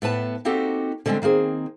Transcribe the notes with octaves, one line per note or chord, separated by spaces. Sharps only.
A2 B3 B4 A5
A#3 C4 D#4 F#4 G4 A4
D3 G3 G#3 C4 D4 G#5
D#3 A#3 C4 G#4